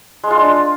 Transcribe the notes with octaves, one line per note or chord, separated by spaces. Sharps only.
G#3
F4
D4